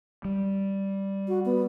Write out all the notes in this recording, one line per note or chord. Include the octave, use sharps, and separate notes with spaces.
G3
F#4
B3